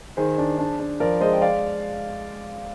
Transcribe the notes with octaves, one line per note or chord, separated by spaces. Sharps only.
D#3 G#4 C5
D4
D4
D4
F3 A#4 D5
G#3 C5 D#5
G5
D5 F5